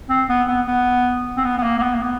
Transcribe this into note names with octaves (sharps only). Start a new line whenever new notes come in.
C4
B3
B3
B3
C4
B3
B3
A#3
A#3
B3
A#3
B3